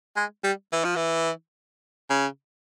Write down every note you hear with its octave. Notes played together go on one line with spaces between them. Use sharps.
G#3
G3
E3
F3
E3
C#3